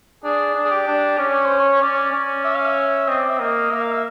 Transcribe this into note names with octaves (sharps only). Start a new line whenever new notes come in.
D4 G#4
D4
G#4
G4
D4
C#4 D5
C#5
C5
C#5
C#4 D5
D5
C#4
E5
F5
E5
C4 D#5
D5
E5
A#3 D#5
A#3 E5
F5
E5